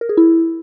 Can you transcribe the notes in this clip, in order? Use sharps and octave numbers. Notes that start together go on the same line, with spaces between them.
A#4
G#4
E4